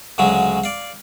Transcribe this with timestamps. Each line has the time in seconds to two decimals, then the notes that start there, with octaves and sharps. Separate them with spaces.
0.18 D2 C#3 F#3 G#3
0.64 D5 F5